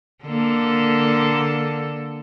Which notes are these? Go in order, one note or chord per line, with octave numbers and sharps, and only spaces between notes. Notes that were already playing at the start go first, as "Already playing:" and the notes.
D3 A#3 A4